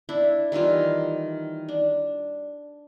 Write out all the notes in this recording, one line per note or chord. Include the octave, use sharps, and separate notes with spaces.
D4 E4
D#3 E3 G3 F4
D4